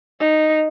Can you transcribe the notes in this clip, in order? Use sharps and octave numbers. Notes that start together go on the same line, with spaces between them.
D#4